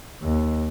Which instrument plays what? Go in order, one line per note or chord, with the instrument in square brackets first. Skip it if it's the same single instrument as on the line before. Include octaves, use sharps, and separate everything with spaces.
[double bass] D#2